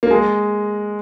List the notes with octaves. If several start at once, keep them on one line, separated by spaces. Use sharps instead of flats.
A#3
G#3